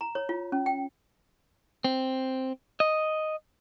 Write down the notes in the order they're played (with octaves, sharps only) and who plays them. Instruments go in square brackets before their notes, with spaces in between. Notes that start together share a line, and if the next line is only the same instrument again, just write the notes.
[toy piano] A#5
C#5
F4
C#4
G5
[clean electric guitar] C4
D#5